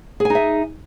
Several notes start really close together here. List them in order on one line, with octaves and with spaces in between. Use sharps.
G#4 G#5 D#4 E5